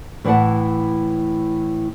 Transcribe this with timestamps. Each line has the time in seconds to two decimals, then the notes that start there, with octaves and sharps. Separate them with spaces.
0.24 A2 E3 E4 D#5 F#5 A5